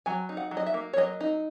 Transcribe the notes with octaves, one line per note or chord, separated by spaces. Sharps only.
F#3 G#5
D#4
F#5
F#3
D#5
E5
A#3
C#5
F#3 D#5
D#4